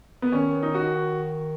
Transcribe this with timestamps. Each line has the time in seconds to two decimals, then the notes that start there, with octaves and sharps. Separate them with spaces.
0.22 B3
0.32 D#3 C#4
0.63 D#4
0.75 F#4